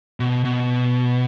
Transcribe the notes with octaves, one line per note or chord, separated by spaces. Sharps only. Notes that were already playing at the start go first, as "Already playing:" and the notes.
B2
B2